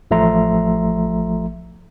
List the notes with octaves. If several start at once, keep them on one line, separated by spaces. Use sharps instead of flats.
A1 F3 A3 E5 A#5 C6